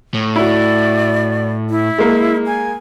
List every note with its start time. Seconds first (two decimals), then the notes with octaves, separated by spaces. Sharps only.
0.14 A2
0.36 E4 F#4 D5
1.70 E4
1.98 G#3 A#3
2.47 G#5